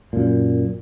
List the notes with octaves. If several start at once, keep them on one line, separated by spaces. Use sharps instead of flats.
F#2 A#2